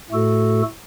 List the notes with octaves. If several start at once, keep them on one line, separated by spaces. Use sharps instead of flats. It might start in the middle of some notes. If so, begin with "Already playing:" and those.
A2 A3 F#4 A4